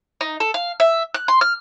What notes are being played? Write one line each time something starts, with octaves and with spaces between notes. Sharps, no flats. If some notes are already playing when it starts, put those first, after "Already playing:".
D#4
A4
F5
E5
F#6
C6
F6